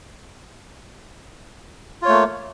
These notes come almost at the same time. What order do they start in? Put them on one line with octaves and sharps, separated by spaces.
F4 C#5 A3 A#3